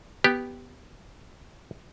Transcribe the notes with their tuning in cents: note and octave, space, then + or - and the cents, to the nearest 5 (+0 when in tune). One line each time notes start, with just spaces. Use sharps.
B3 +0 G4 +0